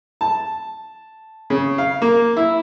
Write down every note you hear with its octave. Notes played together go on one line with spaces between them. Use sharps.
A5
C#3
F5
A#3
E4